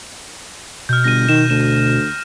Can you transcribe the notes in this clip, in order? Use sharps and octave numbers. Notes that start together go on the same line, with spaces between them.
B2 F6 G6
G1 A#6 D#7
D#3 E7
D2 E7